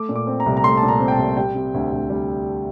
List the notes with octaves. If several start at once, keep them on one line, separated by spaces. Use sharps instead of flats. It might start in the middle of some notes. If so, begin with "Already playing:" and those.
Already playing: A3 D6
A#2
D6
C4
A#5
C2
A#5
A3 C6
A5
A#2
A#5
C4
G5
A5
C2
G3 G5
C3
D2
D2
G3